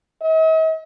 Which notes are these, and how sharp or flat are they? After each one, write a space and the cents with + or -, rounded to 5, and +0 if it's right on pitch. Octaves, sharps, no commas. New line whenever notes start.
D#5 +45